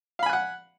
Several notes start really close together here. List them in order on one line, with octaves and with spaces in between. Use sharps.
F5 B5 G#5 F#6 F#5